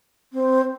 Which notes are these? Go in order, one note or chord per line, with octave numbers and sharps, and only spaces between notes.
C4